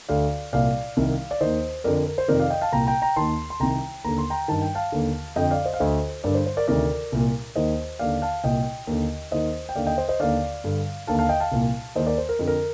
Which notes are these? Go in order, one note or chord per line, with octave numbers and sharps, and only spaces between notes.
D2 D3 D5 F5
C2 A#2 D5 F5
C2 C3 D#3
D5
D#2 D#3 C5 D#5
F2 D3 A#4 D5
A#4
A#4
C5
F2 C3 D#3 A#4 D5
D5 F5
D#5 G5
F5 A5
C2 A#2 G5 A#5
G5 A#5
G5 A#5
D#2 D#3 A5 C6
C6
C2 C3 D#3 G5 A#5
D#2 D3 A#5
C6
G5 A#5
G2 D#3 A5
G5
F5 A5
D#2 D3
F2 D3 D#5 G5
D5 F5
C5 D#5
F5
D2 D3 C5 D#5
G2 D3 A#4 D5
C5
C5
A#4 D5
D2 C3 D#3 A#4 D5
C2 A#2
D#2 D#3 C5 D#5
D#2 D3 D5 F5
F5 A5
C2 A#2 D#5 G5
D#2 D3
D#2 D#3 C5 D#5
G5
D#2 D3 D5 F5
D#5 G5
C5 D#5
C5 D#5
D#2 D3 D5 F5
G2 D3
D#2 D3 F5 A5
F5 A5
D#5 G5
F5 A5
C2 A#2
D#2 D#3 C5 D#5
A#4 D5
C5
A#4
F2 D3
A#4